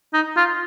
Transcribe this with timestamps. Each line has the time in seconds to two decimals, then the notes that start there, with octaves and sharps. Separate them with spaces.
0.13 D#4
0.37 F4